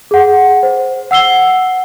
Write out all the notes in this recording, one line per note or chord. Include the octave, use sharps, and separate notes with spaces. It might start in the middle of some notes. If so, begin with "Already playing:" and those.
G#4 F#5
C5
F#5 E6 C7 G7